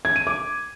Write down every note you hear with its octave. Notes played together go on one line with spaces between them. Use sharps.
G#6
D#7
D6